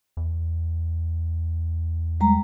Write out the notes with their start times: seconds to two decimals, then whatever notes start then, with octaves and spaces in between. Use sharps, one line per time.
0.17 E2
2.20 G3 G#3 A#5